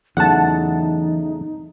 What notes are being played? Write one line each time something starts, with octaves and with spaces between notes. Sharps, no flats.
E2 C#3 E3 F#3 A3 D#4 F#5 A5